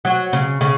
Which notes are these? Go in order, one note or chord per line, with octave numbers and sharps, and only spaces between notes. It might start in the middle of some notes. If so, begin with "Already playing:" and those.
F#3
C#3
C#3